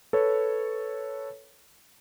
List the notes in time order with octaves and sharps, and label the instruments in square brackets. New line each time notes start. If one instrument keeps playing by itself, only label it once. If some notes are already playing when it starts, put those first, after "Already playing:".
[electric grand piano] A4 B4 C#5